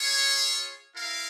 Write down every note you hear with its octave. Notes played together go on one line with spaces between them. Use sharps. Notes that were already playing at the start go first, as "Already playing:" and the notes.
Already playing: F4 G#4 C#5
E4 A#4 F5